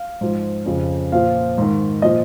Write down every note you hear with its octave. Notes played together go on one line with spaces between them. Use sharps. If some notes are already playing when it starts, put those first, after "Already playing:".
Already playing: F5
G#2 F3
F2 C#3 F3
A#2 F3 F5
G#2 D#3
A#2 F3 D#5